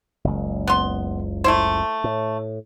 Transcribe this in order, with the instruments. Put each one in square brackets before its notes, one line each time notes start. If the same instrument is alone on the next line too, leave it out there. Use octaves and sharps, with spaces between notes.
[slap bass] F#1 C#2
[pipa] B3 C6
A3 E4 C5
[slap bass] A2